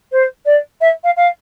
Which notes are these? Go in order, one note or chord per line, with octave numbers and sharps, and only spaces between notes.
C5
D5
E5
F5
F5